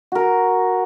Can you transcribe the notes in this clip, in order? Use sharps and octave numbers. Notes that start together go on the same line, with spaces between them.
F#4 A#4